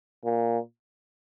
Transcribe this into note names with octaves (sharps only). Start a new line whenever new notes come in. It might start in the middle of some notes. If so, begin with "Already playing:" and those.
A#2